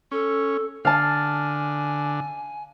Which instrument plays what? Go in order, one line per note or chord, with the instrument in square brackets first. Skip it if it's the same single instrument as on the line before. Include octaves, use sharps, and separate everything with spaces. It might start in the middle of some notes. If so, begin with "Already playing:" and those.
[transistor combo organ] C#4 [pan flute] A4
[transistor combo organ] D3 [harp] F5 A5 [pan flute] G#5